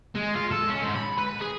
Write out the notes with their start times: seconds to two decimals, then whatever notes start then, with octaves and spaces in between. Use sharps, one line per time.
0.15 G#3
0.35 F4
0.51 A4
0.69 C#4
0.82 G#2
0.95 B5
1.18 B4
1.41 G#4